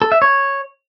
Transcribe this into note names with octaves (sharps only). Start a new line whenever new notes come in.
A4
E5
C#5